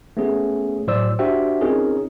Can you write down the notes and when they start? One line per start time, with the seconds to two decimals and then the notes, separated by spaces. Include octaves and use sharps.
0.17 A3 B3 C#4 G#4
0.87 A2 F#3 C5 D5 E6
1.19 D4 F#4 G4 C5 E5 G5
1.61 C4 C#4 D#4 F4 G#4 A#4